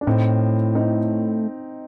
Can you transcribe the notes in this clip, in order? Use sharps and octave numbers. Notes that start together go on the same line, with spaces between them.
D4
A2 C4 D#4
C4 D#4